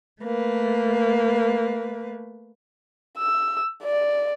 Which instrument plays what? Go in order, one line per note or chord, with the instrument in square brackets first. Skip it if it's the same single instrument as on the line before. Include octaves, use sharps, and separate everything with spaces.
[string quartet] A3 A#3 B4
[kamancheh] E6
D5